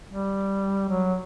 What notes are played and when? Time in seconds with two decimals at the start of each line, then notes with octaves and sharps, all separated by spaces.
0.08 G3
0.88 F#3